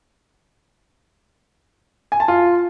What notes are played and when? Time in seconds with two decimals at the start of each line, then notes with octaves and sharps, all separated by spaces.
2.12 G#5
2.20 A5
2.28 F4